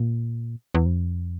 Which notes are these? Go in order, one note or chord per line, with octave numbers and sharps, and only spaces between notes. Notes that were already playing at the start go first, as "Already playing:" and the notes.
Already playing: A#2
E2
F2